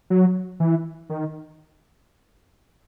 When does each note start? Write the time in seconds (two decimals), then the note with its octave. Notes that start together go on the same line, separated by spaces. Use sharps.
0.10 F#3
0.60 E3
1.10 D#3